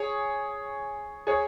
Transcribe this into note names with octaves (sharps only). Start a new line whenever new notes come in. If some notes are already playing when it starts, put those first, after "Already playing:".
Already playing: G#4 C#5
G#4 C#5